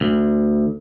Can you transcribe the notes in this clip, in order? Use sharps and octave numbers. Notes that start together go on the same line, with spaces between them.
D2